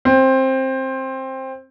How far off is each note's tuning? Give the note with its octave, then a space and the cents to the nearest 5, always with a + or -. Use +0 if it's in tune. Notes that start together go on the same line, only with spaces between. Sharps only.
C4 +15